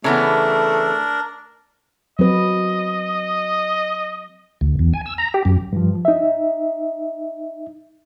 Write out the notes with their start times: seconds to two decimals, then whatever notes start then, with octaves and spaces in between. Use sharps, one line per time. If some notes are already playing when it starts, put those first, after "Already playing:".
0.04 C#3 E3 A3 B3 D4 A#4
2.19 F#3 C4 B4 D#5
4.61 D2
4.79 E2
4.93 G#5
5.06 E6
5.18 A#5
5.34 G4
5.45 F#2
5.73 G2 F3
6.05 D#4 E5